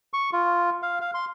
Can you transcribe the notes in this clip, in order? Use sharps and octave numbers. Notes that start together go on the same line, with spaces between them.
C#6
F4
F5
F5
C6